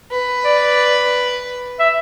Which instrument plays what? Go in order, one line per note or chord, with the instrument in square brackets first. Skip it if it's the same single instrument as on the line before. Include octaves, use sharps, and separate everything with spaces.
[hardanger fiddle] B4
[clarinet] D5
E5